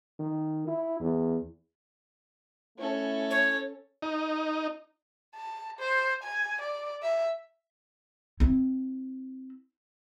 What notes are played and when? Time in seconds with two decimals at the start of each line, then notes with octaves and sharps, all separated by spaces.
0.20 D#3
0.68 E4
1.00 E2
2.78 A3 C#4 E4 A4
3.30 C#5
4.02 D#4
5.35 A5
5.79 C5
6.23 G#5
6.61 D5
7.02 E5
8.40 C4 E4